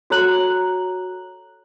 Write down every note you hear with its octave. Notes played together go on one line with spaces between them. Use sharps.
F#4 A4 C#5 A#5 F#6 F#7